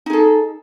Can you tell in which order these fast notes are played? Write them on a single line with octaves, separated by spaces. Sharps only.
D#4 G#4 A4